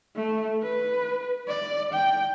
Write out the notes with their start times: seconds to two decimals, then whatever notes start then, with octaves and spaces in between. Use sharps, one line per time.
0.16 A3
0.63 B4
1.48 D5
1.93 G5